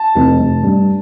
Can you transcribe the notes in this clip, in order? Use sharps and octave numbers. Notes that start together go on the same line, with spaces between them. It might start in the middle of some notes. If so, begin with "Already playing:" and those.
Already playing: A5
F1
F1
G2